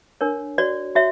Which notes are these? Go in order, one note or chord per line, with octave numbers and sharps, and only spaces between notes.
D4 A#4 C#5
F#4 C#5 D5
F#4 C#5 E5